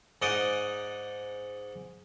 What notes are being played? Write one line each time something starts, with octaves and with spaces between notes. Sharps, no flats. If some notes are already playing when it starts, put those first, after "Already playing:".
G#2 D#4 D5 D#5 F#5 C#6